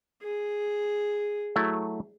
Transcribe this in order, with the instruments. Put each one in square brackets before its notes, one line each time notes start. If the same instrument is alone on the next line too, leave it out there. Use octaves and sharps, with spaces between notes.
[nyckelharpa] G#4
[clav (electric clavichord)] F#3 A3 E4